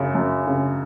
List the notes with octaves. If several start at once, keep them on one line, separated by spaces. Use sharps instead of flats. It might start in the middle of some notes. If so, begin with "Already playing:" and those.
Already playing: F#2 C#3
F#2
C#3